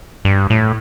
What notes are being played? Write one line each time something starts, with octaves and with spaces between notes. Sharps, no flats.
G2
A2